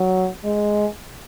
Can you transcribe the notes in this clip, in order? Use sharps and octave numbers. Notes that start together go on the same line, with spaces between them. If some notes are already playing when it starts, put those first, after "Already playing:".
Already playing: F#3
G#3